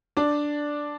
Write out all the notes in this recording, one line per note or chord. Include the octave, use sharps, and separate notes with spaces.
D4 D5